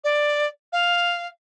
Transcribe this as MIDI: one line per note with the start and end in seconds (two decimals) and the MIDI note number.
0.04 0.47 74
0.72 1.27 77